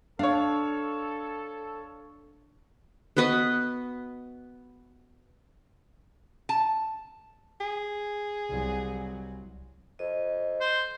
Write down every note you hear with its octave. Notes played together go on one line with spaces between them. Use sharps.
D4 A4 C#5 F5
B3 F#4 B4 D#5
A5
G#4
C2 F#3
F2 D#5
C5